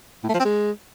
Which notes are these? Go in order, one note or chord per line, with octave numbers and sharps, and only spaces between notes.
A2
A3
F3
C4
G#3